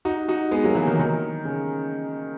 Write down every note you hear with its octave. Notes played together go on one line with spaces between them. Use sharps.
D#4 F#4
D#4 F#4
G#3 B3
F#3 A#3
E3 G#3
D#3 F#3
D#3
C#3